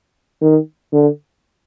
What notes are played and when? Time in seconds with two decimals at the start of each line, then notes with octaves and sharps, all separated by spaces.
0.41 D#3
0.92 D3